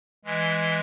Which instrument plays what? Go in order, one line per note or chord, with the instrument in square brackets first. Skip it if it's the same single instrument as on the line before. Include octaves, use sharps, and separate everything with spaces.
[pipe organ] E3 G#3